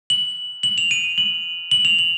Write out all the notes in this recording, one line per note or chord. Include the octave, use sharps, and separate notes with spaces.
F#7
F#7
F7
D#7
F#7
F#7
F7
F#7